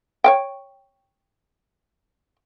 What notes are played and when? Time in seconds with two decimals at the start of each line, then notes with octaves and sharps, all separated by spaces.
0.24 C#5 F5 G5